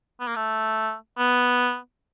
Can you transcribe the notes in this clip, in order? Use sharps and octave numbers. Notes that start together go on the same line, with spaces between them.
B3
A#3
A3
B3